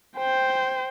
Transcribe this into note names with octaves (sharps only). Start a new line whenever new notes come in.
C5 G5